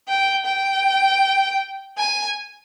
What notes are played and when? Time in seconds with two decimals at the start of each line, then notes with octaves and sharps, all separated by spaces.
0.09 G5
0.46 G5
1.99 G#5